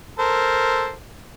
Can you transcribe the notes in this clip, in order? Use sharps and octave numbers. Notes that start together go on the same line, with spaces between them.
A4 A#4 C5